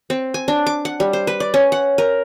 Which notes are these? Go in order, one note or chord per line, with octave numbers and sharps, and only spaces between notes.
C4
G#5
D4
D6
F#5
G3
C5
B4
D5
C#4
F#5
A#4